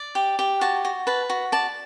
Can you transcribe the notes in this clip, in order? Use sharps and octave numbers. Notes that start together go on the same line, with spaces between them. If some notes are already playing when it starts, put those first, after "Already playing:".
Already playing: D5
G4
G4
F#4 A5
F#4
B4 A5
F#4
D5 A5